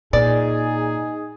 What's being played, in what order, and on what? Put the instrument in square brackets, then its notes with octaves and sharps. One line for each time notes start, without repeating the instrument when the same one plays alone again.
[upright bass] A#2 [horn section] D#4 G#4 [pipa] D5